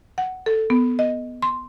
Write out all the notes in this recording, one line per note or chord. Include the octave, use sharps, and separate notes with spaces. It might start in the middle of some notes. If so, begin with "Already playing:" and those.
F#5
A4
B3
D#5
C6